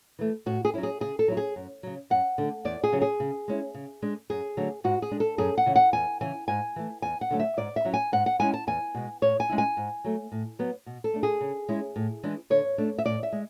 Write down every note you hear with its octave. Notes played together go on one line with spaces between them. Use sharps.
E3 A3
A2 F#4
G#4
F#3 C#4 E4
G#4
C#3 G#4
A4
F#3 C#4 E4
G#4
F#2
C#3 F#3
F#2 F#5
D3 A3
E2 D5
G#4
C#3 F#3 C#4
G#4
C#3
G#3 C#4 E4
C#3
G#3 D4
F#2 G#4
D3 F#3 A3
G#2 F#4
G#4
G#3 D4
A4
F#2 G#4
F#5
C#3 E3
F#5
E2 G#5
C#3 E3 G#5
G#2 G#5
E3 A3
E2 G#5
F#5
D3 F#3 A3
E5
G#2 D5
E5
F#3 C#4 E4
G#5
G#2 F#5
F#5
G#3 C#4 E4 G#5
A5
E2 G#5
B2 G#3
A2 C#5
G#5
G#3 C#4 E4
G#5
G#2
F#3 A3
A2
F#3 B3
B2
A4
A3 D4
G#4
C#3
G#3 C#4 E4
A2
E3 G#3 D4
D3 C#5
A3 D4
E5
A2 D5
E5
G#3